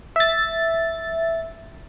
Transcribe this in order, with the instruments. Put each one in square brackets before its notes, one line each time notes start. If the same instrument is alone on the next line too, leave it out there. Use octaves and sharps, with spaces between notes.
[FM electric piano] E5 A6